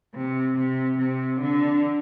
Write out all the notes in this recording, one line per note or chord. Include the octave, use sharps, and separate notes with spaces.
C3
C3
C3
D3